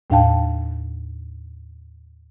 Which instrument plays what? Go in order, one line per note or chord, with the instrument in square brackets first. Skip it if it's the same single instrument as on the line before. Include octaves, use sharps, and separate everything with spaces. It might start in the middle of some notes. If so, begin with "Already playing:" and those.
[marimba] D#2 A2 D4 F5 G5 A5